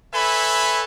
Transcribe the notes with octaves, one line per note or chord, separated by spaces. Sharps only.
A4 B4 C#5 E5 G#5 B5